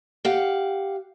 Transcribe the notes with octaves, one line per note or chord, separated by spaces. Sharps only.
G4 F5 F#5